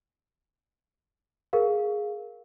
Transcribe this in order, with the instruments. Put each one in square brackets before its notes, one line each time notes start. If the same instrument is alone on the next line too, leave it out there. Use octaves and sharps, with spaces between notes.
[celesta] G#4 A#4 F5